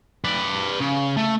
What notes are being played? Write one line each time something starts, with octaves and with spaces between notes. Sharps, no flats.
B4 D5
C#3
A3